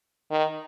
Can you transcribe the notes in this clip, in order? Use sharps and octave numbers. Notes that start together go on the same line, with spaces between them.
D#3